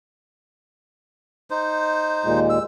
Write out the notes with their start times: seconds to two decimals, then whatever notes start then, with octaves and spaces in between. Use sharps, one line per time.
1.50 D#4 C5
2.25 D#2 A#2 G#3
2.49 E6